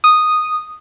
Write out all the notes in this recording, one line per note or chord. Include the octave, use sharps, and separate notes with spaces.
D#6